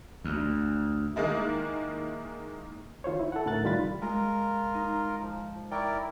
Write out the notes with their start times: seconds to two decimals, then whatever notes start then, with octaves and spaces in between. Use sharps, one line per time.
0.24 D2
1.16 D#3 G#3 A#3 D#4 E4
3.04 D#3 F4 C5 C#5
3.19 E4
3.32 A4 F#5
3.46 D2 A2 A3 A#4 F#6 A6
3.63 C2 D#3 G3 F4 B5 A6
4.02 G#3 F4 A#4
4.74 D#4
5.22 F3
5.71 E4 A#4 D5 G5 C#6